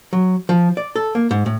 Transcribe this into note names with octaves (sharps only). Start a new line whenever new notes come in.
F#3
F3
D5
A4
A#3
G#2
A2